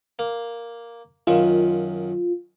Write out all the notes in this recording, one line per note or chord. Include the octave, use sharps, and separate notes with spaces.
A#3
F#2 D#3 F4